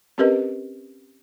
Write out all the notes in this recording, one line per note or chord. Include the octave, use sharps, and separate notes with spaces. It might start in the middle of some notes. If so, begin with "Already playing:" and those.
C4 C#4 G4 A#4 B4 D#5